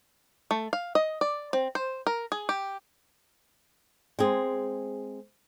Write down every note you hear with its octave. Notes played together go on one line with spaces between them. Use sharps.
A3
F5
D#5
D5
C4
C5
A#4
G#4
G4
G#3 C4 G#4